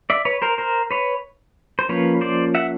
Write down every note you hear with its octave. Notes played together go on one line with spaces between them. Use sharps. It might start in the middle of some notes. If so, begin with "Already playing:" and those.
D5 E5
B4 C#5
A#4 C5
A#4 C5
B4 C#5
C5
F3 A#3 C#4 B4 C#5
C5 D5
E5 F#5